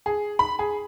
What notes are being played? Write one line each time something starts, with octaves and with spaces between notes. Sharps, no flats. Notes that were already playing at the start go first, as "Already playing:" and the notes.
G#4
B5
G#4